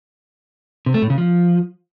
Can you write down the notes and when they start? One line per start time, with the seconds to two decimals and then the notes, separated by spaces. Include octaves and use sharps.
0.86 C3
0.94 A3
1.02 A2
1.10 C#3
1.18 F3